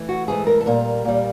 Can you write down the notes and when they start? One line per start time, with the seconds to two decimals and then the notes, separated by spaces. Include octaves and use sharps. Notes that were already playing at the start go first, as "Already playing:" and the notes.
Already playing: E3 A3
0.09 F#4
0.28 G#2 E3 A3 G#4
0.47 A#4
0.60 A4
0.66 A#2 G3 A#4
1.05 A#2 G3